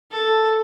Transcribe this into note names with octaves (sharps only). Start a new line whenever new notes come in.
A4